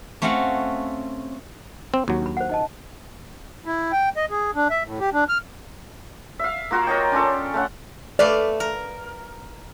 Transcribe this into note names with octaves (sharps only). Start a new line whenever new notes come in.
A3 C4 C#4 F#4 F5 F#5
C4
D#2 F#3
D4 B5
C5 F#5
D#4 D#5 A5
E4
G5
D#5
G#4
D4
E5
A2
G4
D4
F6
E5 F5
A#3 F4 F#4 A#4
A#4 C#5 D#5 G5
C#4 D4 F4 A4
A3 C#4 F#5
A3 B4 D5 F5
A#4